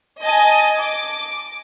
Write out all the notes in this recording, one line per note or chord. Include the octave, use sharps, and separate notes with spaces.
D#5 G#5 A5
D6